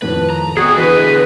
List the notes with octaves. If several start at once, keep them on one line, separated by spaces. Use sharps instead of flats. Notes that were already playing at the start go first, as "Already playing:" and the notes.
F2 A2 D#3 B4
A#5
B3 F#4 G#4 A4 G5
D3 E3 B3 B4 D#5